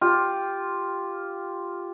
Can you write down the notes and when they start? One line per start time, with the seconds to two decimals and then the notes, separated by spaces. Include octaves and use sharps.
0.01 F4 G4